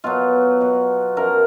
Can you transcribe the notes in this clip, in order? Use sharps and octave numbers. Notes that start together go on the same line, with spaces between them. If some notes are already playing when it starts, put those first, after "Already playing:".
B2 F#3 F4
B2 F#3
F#2 F3 A#4